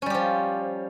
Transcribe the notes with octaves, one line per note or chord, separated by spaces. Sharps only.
F3 G3 C#4 G4